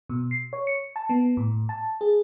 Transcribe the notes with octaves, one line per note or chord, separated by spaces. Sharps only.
B2
C7
C#5
C#7
A5
B3
A2
A5
G#4